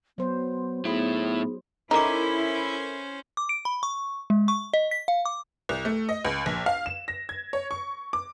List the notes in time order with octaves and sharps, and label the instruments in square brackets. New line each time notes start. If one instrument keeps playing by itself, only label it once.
[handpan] F#3 C5 [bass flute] B3
[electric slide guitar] A2 E4 [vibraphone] B3 D#4 [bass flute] G#4
[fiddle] C#4 C5 [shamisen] D#4 [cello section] E4 [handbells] A4 A#4 D6
[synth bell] D6
D7
B5
C#6
G#3
C#6
D#5
B6
F5
D6
[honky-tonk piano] C2
A3
D#5
C#2
A#1
F5
E7
A#6
G#6
C#5
C#6
D6